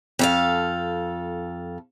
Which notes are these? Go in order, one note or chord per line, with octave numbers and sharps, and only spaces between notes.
F2 A4 F5